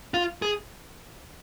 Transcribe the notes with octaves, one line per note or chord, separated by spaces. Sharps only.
F4
G#4